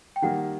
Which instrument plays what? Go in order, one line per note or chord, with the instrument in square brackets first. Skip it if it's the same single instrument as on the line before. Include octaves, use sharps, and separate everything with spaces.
[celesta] G5
[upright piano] D#3 G3 A#3 [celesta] F#5